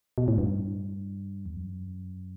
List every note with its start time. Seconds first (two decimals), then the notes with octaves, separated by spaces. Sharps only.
0.18 B2
0.28 A2
0.38 G2
1.46 E2
1.56 F#2